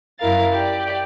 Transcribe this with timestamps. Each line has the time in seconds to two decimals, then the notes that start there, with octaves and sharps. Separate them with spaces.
0.19 F#2 E4 A#4 F5 A6
0.53 G4 D5